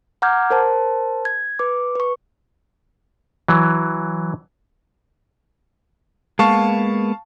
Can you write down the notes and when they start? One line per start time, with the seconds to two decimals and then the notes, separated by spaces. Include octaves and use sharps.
0.22 F#5 A#5 D6 F6 G6 G#6
0.50 A#4 C5 A5
1.25 G#6
1.59 B4 D6
1.95 B4 C#6
3.48 E3 F#3
6.39 G#3 A#3 B3 F5 A5 C#6